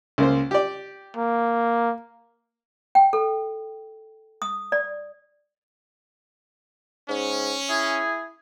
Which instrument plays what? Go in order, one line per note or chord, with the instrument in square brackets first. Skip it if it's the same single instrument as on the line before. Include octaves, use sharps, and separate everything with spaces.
[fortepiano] C#2 A#3 C5
G4 D5
[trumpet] A#3
[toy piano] G5
A4
D#6
D5
[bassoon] G#2 [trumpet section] C#4
[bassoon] E4 [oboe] G#4